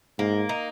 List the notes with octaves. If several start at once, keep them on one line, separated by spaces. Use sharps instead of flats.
G#2 A#3
D#4